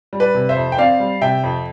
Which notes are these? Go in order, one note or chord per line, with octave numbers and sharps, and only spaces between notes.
G3
B4 D5
C3
C5 E5
F2
G5
C4 D5 F5
G3
C3 E5 G5
F2